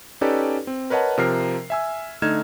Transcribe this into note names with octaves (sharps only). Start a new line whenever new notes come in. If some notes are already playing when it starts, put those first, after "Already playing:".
C#4 D#4 G4 A4 B4 D5
C4
A#4 B4 C#5 D#5 F#5 A5
C3 F3 A#4 A#5 F6 C7
E5 G#5 E6
D3 A3 D#4 F6 G#6 E7